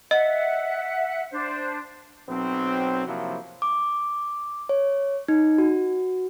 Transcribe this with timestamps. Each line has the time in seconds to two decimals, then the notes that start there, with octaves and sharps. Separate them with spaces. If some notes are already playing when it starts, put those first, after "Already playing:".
0.11 D#5 E5 F#5
1.31 D4 C5
2.29 B1 F#3 C4
3.07 C3 F3 F#3 A#3 E4
3.62 D6
4.69 C#5
5.28 D#4
5.58 F#4